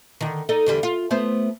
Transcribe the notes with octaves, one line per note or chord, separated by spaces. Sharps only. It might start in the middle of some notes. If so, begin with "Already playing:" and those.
D3 D#3
D#4 A4 D5
E2 D3 G3
F4
A3 B3 C5